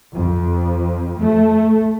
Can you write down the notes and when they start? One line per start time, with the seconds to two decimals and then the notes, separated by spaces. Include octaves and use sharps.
0.15 F2
1.21 A3